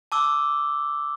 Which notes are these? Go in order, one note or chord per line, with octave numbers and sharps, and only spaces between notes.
A5 D6 E6 G7